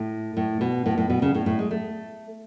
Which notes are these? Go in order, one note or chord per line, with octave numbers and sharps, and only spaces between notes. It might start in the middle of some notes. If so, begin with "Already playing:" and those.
Already playing: A2
A2
B2
A2
A2
B2
C#3
A2
A2
G#3
A3